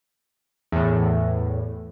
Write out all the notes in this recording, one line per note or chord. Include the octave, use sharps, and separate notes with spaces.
E2 A2